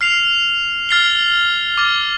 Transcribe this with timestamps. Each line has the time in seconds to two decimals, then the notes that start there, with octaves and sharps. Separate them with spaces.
0.01 F6 C7 F7
0.89 F6 A6 C7 G7
1.77 D6 F6 A6